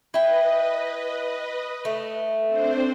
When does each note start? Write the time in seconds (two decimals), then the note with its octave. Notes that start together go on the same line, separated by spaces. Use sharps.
0.14 E4 B4 D#5 G5
1.85 A3
2.47 C4 D4 C5